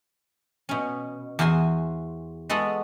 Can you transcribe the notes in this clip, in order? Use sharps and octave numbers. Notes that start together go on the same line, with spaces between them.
B2 C#4
E2 F#4 C5 G#5 C6
G#3 B3 F#4 A4 D#5